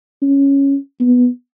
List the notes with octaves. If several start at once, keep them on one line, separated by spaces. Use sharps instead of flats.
C#4
B3